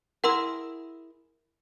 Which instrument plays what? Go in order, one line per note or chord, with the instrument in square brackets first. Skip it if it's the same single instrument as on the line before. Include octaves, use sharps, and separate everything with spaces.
[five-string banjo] E4 G#4 A#4 [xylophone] F#5 C6 E6